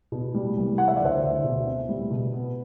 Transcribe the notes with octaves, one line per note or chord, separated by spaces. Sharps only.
B2
G3
C2
E3 F#5
E5
D5
D2 C5 E5
D2
B2
C4
G3
B2
B3